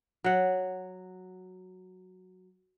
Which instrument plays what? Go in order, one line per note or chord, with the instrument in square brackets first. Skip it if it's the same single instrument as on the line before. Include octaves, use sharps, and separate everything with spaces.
[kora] F#3 F#5